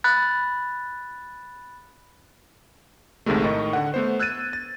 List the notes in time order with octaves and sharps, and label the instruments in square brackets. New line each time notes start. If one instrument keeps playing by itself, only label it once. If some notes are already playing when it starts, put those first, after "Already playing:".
[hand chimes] B5 F#6 A6
[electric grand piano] A#1 D#2 C3 D#3 G#3 A3
A2 D#3 D#5 C#6
D3 F#5
A3 B3 C5
E6 F#6 G#6 A6 D#7
A6